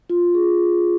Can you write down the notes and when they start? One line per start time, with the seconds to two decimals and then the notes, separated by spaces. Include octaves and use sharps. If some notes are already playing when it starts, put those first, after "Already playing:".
0.10 F4
0.34 G#4